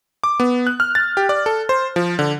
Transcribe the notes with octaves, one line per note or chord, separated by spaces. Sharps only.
D6
B3
F#6
F6
A6
G4
D5
A4
C5
F3
D3